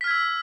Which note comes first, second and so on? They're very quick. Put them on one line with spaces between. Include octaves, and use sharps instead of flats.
B6 F6 G#6 E6